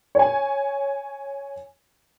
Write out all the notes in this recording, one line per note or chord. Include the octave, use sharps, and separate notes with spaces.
C#5 G#5